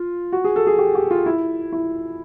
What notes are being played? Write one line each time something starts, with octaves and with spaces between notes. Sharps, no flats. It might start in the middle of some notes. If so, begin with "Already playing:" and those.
Already playing: F4
F#4
G#4
A4
G#4
G4
G4
F4
E4
E4